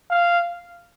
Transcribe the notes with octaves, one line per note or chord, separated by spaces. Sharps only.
F5